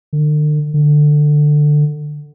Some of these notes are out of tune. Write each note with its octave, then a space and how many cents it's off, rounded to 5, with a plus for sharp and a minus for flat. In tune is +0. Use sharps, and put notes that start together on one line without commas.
D3 +45
D3 +15